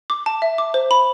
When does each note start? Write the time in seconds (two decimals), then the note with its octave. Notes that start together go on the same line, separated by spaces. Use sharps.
0.10 D6
0.26 A5
0.42 E5
0.58 D6
0.74 C5
0.91 B5